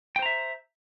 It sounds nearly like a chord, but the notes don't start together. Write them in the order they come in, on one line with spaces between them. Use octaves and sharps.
G5 C5 A#5 E5